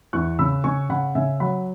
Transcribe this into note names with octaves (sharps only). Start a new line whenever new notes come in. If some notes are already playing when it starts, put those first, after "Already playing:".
E2 C#6 F#6
C#3 B5 E6
C#3 G#5 C#6
C#3 F#5 B5
C#3 E5 G#5
F#3 F#5 B5